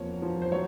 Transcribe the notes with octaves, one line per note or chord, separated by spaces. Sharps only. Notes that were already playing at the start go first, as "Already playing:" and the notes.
Already playing: E2 C3 F3 A#3 C#5
F3
C5
F#3 C#5